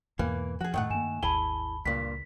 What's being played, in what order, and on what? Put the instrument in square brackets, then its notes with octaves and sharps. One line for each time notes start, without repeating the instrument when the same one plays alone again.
[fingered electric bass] E2 G#2 B2 [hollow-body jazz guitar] E3 A#3
[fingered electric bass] F3 [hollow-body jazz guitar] F#4 G#4
[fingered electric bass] F#2 A2 [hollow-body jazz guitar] D#3 A3 F#5
[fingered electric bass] G2 A#3 [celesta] G#5 E7
[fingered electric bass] G#1 D#2 [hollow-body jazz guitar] E4 G#4 G#5 [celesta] A5 B5 G7
[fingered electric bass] C#2 [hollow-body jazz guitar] G2 A#2 [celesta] B6